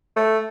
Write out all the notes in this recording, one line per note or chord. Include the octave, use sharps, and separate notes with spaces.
A3